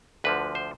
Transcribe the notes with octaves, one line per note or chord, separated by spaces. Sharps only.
D2 D3 F3 B4
C5